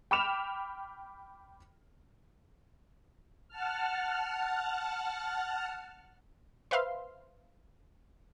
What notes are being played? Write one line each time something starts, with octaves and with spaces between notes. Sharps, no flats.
G5 B5 D6 F6 E7 F7
F#5 A5 F6
B4 C5 E5 F5 C6